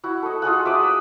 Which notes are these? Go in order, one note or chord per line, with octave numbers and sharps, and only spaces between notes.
E4 F#4
A4 D#5
F4 F#4 G#4 F#5
E5 D6 D#6
D#6 E6